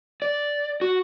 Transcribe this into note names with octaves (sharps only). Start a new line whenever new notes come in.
D5
F#4